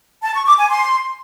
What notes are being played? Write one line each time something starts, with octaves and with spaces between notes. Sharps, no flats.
A5
C#6
D6
G#5
C6